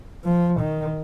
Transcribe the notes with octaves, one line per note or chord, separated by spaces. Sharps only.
F3
D#3